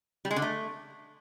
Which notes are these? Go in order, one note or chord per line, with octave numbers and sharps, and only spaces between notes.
G3
G#3
D3
A3